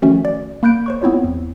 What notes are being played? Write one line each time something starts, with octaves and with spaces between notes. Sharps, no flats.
D#3 F3 A3 C#4 F#4
D5
A#3 B5 F#6 G6 D7
C5 C#5 C#6
B3 C4 E4 F4 C#5
E2